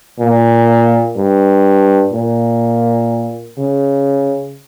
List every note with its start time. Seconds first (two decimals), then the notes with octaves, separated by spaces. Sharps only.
0.20 A#2
1.17 G2
2.13 A#2
3.58 C#3